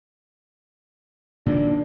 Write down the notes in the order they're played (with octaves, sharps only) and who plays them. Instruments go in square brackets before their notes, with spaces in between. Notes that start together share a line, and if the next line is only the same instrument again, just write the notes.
[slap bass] A#2 D#3 A#3 [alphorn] D4